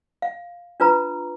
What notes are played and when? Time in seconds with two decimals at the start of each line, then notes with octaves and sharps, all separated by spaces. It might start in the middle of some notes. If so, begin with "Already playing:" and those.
0.22 F5
0.80 D4 F4 B4 A#5